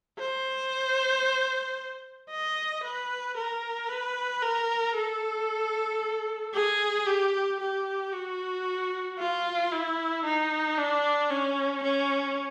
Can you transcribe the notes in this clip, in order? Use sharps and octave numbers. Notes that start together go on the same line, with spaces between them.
C5
D#5
B4
A#4
B4
A#4
A4
G#4
G4
G4
F#4
F4
E4
D#4
D4
C#4
C#4